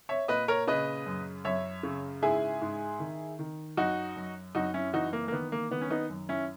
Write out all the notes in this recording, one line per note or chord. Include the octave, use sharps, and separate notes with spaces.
C#5 E5
A#2 B4 D#5
A#4 C#5
C#3 B4 D#5
F#2
F#2 C#5 E5
C#3
G#2 E4 G#4
G#2
D#3
D#3
F#2 D#4 F#4
F#2
F#2 D#4 F#4
C#4 E4
E3 D#4 F#4
A#3
A#3
D#3 B3
A#3
D#3 B3
C#4
B3 D#4
F#2
C#4 E4